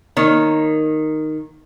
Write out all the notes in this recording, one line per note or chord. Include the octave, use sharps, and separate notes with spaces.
D#3 A#3 C#5